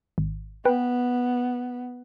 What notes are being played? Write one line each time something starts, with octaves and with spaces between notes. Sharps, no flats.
G#1
B3 B4 G5